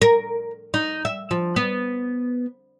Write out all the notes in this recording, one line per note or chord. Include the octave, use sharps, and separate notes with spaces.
A#4
D#4
E5
F3
B3